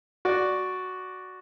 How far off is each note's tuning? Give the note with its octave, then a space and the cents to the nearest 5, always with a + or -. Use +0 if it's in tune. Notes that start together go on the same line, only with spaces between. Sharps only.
F#4 +0 D5 +0